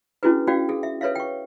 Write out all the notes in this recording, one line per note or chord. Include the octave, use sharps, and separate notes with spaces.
C#4 D4 E4 F#4 G#4 B4
C#4 F#4 D5 F5 G5
G#4 A4
E5
A4 B4 C#5 E5 F5
G5 C#6